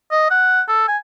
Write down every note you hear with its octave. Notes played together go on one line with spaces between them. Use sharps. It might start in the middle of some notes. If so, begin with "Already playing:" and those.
D#5
F#5
A4
G#5